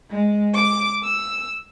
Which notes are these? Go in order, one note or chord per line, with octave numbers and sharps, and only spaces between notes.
G#3
D6
E6